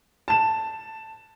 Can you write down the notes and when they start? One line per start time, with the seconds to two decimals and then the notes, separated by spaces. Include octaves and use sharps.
0.28 A5 E7